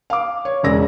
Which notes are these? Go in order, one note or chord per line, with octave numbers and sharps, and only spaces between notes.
F5 D6
C#5
E1 C#3 G#3 D5 E6 A#6